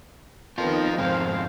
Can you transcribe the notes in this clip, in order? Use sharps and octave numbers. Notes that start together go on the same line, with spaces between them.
D#3 F3 B3 C4 F4 A#4
F2 G#2 C4 C5 F5